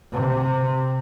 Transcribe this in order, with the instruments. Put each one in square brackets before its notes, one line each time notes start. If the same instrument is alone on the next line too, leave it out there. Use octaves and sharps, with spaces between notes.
[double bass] C3